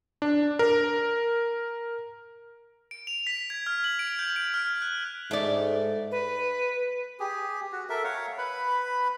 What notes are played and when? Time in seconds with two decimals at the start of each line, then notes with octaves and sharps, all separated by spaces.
0.22 D4
0.59 A#4
2.91 D7
3.07 F7
3.27 B6
3.50 G#6
3.66 F6
3.84 F#7
3.99 D7
4.19 G6
4.36 D7
4.54 F6
4.82 F#6
5.31 G#2 A3 D5
6.11 B4
7.20 G4 G#4
7.72 F#4
7.89 A4 A#4 E5
8.04 C#5 F5 F#5
8.38 B4 B5